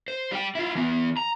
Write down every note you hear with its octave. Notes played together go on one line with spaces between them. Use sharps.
C5
G3 G5
E4 F4
E3 B3
A#5